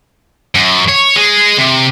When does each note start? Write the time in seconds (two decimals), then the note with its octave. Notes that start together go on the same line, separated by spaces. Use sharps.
0.55 F#2
0.89 C#5
1.16 G#3
1.58 C3